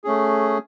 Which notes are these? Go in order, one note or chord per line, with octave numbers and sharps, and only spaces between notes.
A3 C#4 G#4